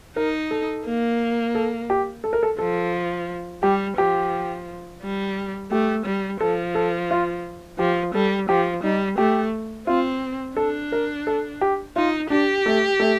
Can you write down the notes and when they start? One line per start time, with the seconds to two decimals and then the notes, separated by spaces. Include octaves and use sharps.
0.16 D#4 A#4
0.51 A4
0.86 A#3
1.55 A4
1.90 G4
2.24 A4
2.33 A#4
2.43 A4
2.59 F3 A4
3.63 G3 G4
3.98 F3 G4
5.02 G3
5.71 A3 G4
6.06 G3
6.41 F3 A4
6.75 A4
7.11 F4
7.79 F3 G4
8.14 G3 A4
8.49 F3 G4
8.83 G3 D#4
9.18 A3 G4
9.87 C4 F4
10.57 D4 A4
10.92 A#4
11.27 A4
11.61 G4
11.96 D#4 F4
12.30 D4 G4
12.66 A3
13.00 A3